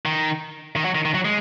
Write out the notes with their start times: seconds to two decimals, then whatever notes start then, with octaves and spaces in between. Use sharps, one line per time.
0.06 D#3
0.76 D#3
0.85 F#3
0.95 D#3
1.05 D#3
1.15 F#3
1.25 G#3